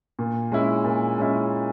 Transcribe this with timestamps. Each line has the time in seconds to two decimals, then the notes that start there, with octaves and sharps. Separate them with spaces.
0.19 A#2
0.52 G#3 C#4 E4
0.84 A#2
1.18 G#3 C#4 E4